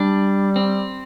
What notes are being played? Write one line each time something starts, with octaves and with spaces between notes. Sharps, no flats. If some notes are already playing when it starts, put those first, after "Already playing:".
Already playing: G3 D4
C4